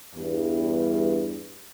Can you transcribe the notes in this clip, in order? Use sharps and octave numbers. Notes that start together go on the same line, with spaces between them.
E2 G2